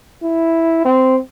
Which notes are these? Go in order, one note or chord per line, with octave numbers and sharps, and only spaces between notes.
E4
C4